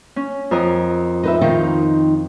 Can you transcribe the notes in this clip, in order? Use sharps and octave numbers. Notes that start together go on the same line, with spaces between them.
C#4
F2 A#4 D#5
D#4 B4 E5
D#3 D#4 F4